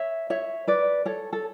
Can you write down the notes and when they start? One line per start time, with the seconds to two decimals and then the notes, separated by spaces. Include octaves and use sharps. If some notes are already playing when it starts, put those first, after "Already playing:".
Already playing: C#5 E5
0.30 C#5 E5
0.67 B4 D5
1.05 A4 C#5
1.33 A4